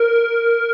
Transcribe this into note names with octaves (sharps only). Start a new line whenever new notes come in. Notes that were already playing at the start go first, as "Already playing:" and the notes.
Already playing: A#4